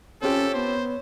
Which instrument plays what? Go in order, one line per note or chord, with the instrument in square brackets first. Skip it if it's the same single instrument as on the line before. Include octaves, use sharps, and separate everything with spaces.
[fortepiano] C4 F4 G4 [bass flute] C#4 [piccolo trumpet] A4 [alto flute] C#5
[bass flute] B3 [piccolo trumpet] C5